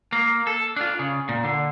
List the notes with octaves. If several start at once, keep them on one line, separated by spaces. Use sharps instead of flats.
A#3
A4
D4 F4
C#3
A#2
D3